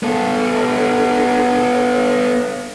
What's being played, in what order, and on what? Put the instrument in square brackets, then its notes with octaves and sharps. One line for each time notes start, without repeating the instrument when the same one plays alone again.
[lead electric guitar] B3 A4